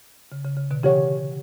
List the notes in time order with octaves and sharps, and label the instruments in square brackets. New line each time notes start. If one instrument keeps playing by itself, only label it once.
[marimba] C#3
C#3
C#3
B2 D3
[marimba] C#3 E3 [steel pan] G4 C#5 F#5